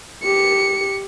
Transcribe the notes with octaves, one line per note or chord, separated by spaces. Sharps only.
G4 C#7